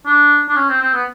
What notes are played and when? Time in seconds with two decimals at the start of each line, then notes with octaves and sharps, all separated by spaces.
0.06 D4
0.49 D4
0.56 C#4
0.69 C4
0.81 C4
0.94 B3